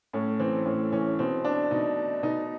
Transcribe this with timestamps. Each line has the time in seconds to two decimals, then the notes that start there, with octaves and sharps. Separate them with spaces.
0.13 A2 C#4
0.40 E3 C4
0.66 A2 C#4
0.93 E3 C#4
1.19 B2 C4
1.45 D4
1.71 B2 D#4
2.23 B2 D#4